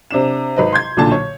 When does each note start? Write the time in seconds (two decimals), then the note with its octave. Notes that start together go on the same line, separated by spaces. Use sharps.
0.11 C3 D4 E7
0.56 G#1 B4 D#5
0.73 C6 G6 G#6
0.97 B1 A#2 D3 A5
1.12 C#5